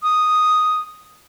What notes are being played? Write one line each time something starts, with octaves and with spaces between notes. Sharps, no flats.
D#6